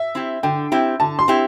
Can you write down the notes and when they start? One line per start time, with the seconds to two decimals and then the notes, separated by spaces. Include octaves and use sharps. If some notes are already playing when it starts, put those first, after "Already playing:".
Already playing: E5
0.15 C4 E4 G4
0.43 D3 G5
0.72 C4 E4 G4
1.00 D3 A5
1.19 C6
1.28 C4 E4 G4